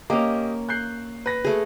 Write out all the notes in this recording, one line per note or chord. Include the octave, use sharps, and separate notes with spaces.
A#3 C#4 G4 D#5 D6
F#6 G6 C7
B4 A#6
A3 G#4